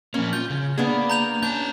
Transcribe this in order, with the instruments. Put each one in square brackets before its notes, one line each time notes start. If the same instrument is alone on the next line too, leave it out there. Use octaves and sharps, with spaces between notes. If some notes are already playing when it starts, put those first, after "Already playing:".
[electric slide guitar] F3 A#3 [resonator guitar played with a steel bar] C#4
[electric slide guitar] F4 [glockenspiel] G6
[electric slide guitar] C#3
[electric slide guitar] A#3 [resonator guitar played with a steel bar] B3 D4 G#4
[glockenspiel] A#5 G6 F7
[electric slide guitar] C#4 A5 [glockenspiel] G6